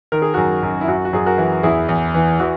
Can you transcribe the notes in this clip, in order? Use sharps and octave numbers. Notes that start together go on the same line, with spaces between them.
D#3 A#4
G#4
F#2 F#4 A#4
F#2
E4
F#2 F#4
F#4
F#2 G#4
F#4 A#4
E3
E2 E4 G#4
E2
E3
E3 F#4